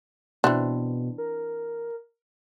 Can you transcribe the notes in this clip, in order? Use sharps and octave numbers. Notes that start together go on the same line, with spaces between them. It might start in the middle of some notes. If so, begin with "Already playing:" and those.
B2 E3 C4 D4
A#4